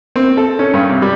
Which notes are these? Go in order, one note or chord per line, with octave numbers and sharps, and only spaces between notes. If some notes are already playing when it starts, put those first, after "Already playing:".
C4
A4
C#4
G2
C3
G3